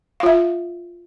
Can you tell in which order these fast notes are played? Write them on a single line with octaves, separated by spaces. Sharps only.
F5 F4 E5